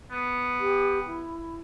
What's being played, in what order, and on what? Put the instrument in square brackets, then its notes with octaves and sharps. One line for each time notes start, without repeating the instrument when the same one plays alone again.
[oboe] B3
[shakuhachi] G4
E4